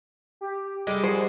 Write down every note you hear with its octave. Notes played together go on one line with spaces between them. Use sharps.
G4
G3 G#3 A4 D#5 D6
F#4 G#4 C5